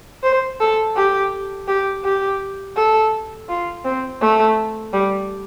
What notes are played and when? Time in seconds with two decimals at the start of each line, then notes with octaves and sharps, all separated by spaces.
0.23 C5
0.60 A4
0.96 G4
1.68 G4
2.04 G4
2.76 A4
3.49 F4
3.85 C4
4.21 A3
4.93 G3